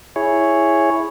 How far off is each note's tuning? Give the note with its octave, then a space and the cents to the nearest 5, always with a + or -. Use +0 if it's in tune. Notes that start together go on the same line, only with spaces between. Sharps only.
E4 +0 G#4 +0 C#5 +0